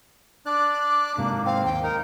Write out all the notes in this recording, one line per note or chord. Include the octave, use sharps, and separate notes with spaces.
D4 D5 D6 F#6
G#2 C3 A#3
C4 F5
D#2 G5
D#4 A#4